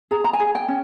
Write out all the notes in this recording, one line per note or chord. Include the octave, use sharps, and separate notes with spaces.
G#4 A#5
A#5
G#5
G#4
G5
C#4